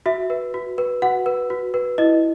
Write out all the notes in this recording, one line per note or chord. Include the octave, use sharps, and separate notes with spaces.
F#4 E5
B4
F#4
B4
F#4 F#5
B4
F#4
B4
E4 D#5